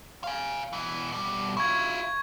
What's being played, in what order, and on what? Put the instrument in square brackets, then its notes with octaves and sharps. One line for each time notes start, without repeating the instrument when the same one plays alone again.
[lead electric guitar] F5 G#5
B2 E3
B2 G3
[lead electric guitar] E4 F4 [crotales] C#6 G#6